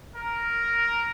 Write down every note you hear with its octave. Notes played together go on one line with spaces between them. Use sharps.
A#4